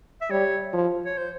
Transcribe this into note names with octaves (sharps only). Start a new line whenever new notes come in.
E5
G3 C#5
F3
C#5
C5